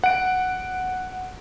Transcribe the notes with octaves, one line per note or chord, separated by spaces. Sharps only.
F#5 D7